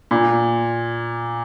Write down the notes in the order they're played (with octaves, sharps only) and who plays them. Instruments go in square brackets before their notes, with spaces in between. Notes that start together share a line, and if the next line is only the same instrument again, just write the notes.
[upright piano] A#2